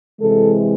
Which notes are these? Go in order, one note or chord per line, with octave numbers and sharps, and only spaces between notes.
C3 E3 G#3 A4